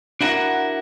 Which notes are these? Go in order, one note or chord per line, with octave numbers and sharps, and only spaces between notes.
D4 E4 F#4 A#4 F#5